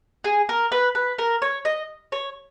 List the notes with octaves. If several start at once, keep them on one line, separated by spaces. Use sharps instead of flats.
G#4
A#4
B4
B4
A#4
C#5
D#5
C#5